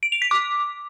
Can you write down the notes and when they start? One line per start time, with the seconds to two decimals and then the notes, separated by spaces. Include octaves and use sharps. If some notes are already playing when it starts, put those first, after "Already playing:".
0.03 D7
0.12 F7
0.22 B6
0.31 D6